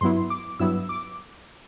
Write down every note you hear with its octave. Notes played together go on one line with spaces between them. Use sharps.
G2 F#3 B3 E4 C6
D6
G2 F#3 B3 E4 E6
D6